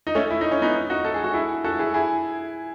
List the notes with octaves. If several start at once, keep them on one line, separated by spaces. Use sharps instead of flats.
D#4
A3 C#4
E4
D#4
C#4
B3 D#4
D#4 F#4
A4
G#4
F#4
E4 G#4
F#4 A4
E4 G#4
E4 G#4